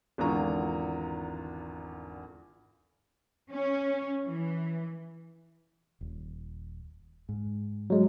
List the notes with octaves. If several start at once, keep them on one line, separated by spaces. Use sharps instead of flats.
G#1 E2 D3 F4 A#5 C#6
C#4
E3
D#1
G#2
F#3 G#3